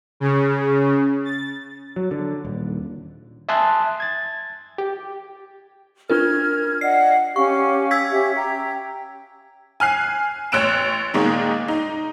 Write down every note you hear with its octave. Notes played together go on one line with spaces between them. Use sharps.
C#3
A6
F#3
D3
D#1
E5 G#5 A5 C6 D#6 F#6
G#6 A6
G4
D4 F4 A#4 F6 G#6
D5 D#5 F#5 C7
C#4 G4 F5 C#6
E6 G#6 B6
C#4 G4 E5
G5 A#5
G#5 F6 F#6 C7
A1 C#5 E6 F#6 D7 E7
A#2 D#3 G#3 D#4
D#4